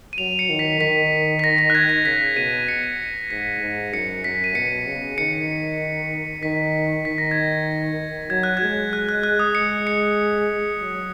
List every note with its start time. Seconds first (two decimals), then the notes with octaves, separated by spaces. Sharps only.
0.13 D#7
0.18 F#3 F7
0.39 C#7
0.49 D#3
0.59 B6
0.81 D#3 B6
1.39 B6
1.44 A#6
1.58 A#6
1.70 F#6
1.75 G#6
1.89 A#6
2.05 C#3 B6
2.37 B2 D#7
2.68 C#7
2.83 D#7
3.30 G#2 B6
3.62 G#2
3.93 F#2 C#7
4.24 F#2 B6
4.44 D#7
4.55 B2 C#7
4.87 C#3
5.18 D#3 C#7
6.43 D#3 B6
7.05 D#3 B6
7.18 A#6
7.31 G#6
7.44 A#6
8.30 F#3 G#6
8.43 F#6
8.57 G#3 G#6
8.93 F#6
9.09 F#6
9.23 F#6
9.39 D#6
9.55 G#3 C#7
9.87 C#7
10.80 F#3